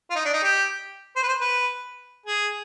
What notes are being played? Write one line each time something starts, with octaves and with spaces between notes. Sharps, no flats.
F4
D#4
D4
D#4
G4
C5
B4
C5
B4
G#4